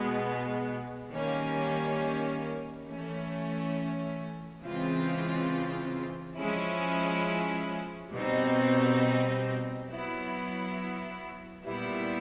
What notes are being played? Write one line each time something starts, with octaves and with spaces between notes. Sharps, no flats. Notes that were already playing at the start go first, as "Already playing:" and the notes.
Already playing: B2 G#3 B3
D#3 G3 A#3 C#4
E3 A3 C#4
C#3 E3 G#3 C4 F4
F3 G#3 C#4 E4
B2 G3 C4 D#4
F#3 B3 E4
A#2 G3 B3 E4